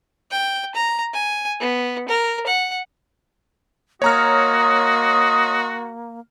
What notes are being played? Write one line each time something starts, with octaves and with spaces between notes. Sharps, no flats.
G5
A#5
G#5
B3
A#4
F#5
A#3 F#4 C#5 D#5 A#5 C6 D#6 F6